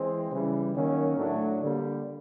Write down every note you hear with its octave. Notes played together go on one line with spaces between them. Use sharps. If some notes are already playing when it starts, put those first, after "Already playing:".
Already playing: E3 G#3 C4
C#3 E3 G3
D#3 F#3 A#3 C#4
A2 F#3 A3 D4
D3 G3 A#3